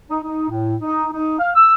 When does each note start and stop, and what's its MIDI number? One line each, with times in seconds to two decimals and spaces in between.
0.11 0.19 63
0.23 0.47 63
0.50 0.76 45
0.81 1.07 63
1.13 1.36 63
1.39 1.50 77
1.55 1.75 88